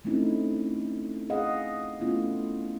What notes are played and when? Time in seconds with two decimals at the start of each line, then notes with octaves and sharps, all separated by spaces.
0.05 G#3 A3 C4 C#4 D#4 E4
1.30 G#4 D#5 F5 F#5
2.00 A3 B3 C#4 E4 F4